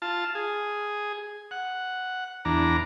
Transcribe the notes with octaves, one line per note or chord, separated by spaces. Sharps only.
F4 A5
G#4
F#5
E2 D4 A#5